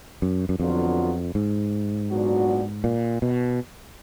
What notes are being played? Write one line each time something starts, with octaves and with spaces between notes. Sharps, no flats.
F#2
F#2
F2 D3 F#3 B3 F4
G#2
A#2 F#3 B3 D4 F#4
A#2
B2